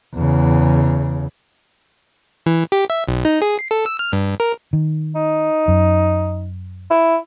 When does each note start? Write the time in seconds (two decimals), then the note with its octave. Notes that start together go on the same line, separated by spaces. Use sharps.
0.14 E2 C#3
2.46 E3
2.72 G4
2.90 E5
3.08 B1
3.25 D#4
3.42 G#4
3.59 C7
3.71 A4
3.86 E6
3.99 F6
4.13 G2
4.40 A#4
4.73 D#3
5.15 D#4
5.68 F#2
6.90 E4